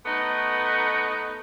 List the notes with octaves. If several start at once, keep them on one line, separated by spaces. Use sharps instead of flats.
A3 B3 D#4